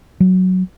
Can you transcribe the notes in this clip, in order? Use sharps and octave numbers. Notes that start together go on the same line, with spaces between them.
F#3